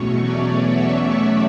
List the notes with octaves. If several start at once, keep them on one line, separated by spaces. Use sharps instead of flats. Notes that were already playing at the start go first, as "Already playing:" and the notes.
Already playing: E2 B2 F#3 A3 C#4 C#5
D5
E5